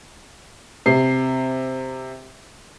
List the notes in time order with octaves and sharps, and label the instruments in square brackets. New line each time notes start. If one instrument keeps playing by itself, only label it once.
[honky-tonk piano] C3 C7